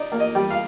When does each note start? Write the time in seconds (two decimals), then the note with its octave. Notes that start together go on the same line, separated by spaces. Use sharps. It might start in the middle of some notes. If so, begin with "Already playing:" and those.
Already playing: D#4 D5
0.12 A#3
0.20 D#5
0.35 G3
0.50 F5